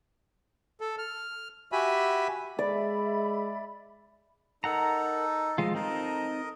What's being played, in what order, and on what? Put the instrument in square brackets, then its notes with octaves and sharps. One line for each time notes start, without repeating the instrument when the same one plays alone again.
[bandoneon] A4
F6
F#4 G4 E5 G#5 B5
[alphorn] G#3 [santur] D5 [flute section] E5 B5
[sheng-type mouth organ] D#4 A4 [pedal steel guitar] A#4 F#5 A#5
[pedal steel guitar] F3 G#3 F4 [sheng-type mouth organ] D#5
[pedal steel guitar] C4 D#4 A4 [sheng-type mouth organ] A#4 D#5